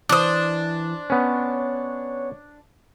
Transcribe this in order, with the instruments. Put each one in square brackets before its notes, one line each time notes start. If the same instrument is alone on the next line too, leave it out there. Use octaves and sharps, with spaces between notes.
[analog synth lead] E3 [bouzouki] D4 C5 [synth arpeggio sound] D6 D#6
[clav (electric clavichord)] B3 C#4 [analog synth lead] C#5